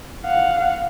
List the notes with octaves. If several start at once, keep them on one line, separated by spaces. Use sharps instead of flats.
F5 F#5